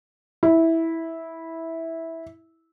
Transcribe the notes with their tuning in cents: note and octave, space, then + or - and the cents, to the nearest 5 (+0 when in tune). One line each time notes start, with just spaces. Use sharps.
E4 -10